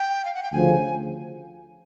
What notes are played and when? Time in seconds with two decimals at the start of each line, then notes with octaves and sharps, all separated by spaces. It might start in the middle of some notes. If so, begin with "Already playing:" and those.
Already playing: G5
0.25 F5
0.35 F#5
0.43 G5
0.52 D2 C#3 F3 G#5